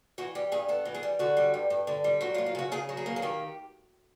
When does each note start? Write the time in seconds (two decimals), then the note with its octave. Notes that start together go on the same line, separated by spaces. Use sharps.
0.18 E3 F#4
0.35 G3 G4
0.52 G2 G#4
0.68 B3 A4
0.85 E3
0.94 G#4
1.03 G3
1.19 D3 F#4
1.37 G3
1.54 G2
1.70 G2
1.87 D3
2.04 G3
2.21 F#3 F#4
2.34 F4
2.38 A#3
2.46 F4
2.55 C#3 F#4
2.72 C#3 G#4
2.89 F#3
2.97 G#4
3.06 A#3
3.16 G#4
3.22 D#3 G4